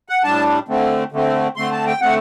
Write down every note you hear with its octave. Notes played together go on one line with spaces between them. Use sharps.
F#5
A2 G3 D4 A5
D3 A3 C4
D3 A3 C4
D3 A3 C4 C6
A5
G5
D3 A3 C4 F#5